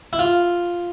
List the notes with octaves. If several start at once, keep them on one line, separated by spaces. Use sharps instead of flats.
E4
F4